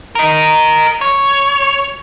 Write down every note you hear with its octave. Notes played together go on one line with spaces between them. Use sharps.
A#4 D#5
C#5